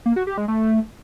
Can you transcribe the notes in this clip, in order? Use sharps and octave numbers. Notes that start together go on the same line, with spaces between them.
A#3
F#4
G4
G#3
A3